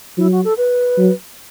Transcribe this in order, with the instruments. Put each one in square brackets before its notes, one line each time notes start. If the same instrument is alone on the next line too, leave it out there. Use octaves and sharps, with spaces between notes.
[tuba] F#3 [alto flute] E4
[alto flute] F#4
A4
B4
[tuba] F#3